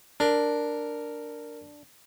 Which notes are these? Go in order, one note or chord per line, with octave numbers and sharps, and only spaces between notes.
D4 A#4